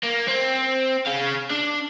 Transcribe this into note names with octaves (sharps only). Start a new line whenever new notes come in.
A#3
C4
G#4 F5
D4